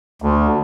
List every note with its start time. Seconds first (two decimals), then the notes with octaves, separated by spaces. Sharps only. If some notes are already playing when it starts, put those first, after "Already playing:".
0.22 D2